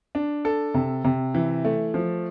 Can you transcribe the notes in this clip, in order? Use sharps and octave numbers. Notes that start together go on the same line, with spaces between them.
D4
A4
C3
C3
E3
A3
F3